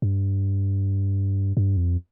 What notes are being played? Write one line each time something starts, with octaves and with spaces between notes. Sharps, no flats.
G2
G2
F2